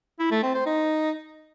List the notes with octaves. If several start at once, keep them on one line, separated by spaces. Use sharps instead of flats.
E4
A3
C4
C5
D#4